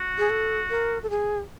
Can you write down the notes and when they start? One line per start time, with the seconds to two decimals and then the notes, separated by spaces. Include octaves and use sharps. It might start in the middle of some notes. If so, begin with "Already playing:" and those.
Already playing: F#4
0.18 G#4
0.30 A4
0.70 A#4
1.03 A4
1.10 G#4